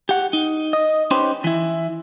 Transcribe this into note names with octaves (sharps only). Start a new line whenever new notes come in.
G4 F#5
D#4
D#5
C#4 D#4 G4 B4 C5
E3 E4